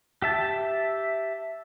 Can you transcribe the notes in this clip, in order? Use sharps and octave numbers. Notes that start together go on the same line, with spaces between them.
G4 E5 A5